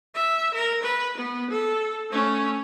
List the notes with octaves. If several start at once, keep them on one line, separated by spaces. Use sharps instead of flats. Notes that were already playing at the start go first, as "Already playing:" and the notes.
E5
A#4
B4
B3
A4
A3 C#4